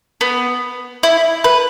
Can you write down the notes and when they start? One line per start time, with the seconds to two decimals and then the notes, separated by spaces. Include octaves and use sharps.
0.21 B3
1.03 E4
1.44 B4